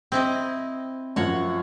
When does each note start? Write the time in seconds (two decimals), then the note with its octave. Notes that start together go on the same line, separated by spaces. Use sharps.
0.12 C4 E4 D#5
1.16 F#2 F3 F#4 C#5 F#5